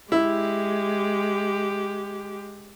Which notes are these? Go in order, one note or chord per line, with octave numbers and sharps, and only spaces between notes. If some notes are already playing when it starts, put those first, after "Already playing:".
G#3 E4 G4